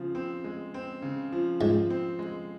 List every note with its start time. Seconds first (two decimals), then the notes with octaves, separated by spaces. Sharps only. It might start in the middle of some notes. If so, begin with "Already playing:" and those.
Already playing: C#3 F3 C4
0.15 C4
0.44 G#3
0.74 C4
1.02 C#3
1.32 F3
1.61 G#2 F3
1.90 C4
2.19 G#3